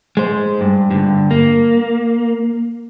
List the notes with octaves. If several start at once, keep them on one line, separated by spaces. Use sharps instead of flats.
G#3 C5
G2
G2 D3
A#3